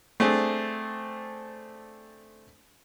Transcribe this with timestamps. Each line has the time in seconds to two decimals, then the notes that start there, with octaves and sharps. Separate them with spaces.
0.20 A3 C4 D4 G#4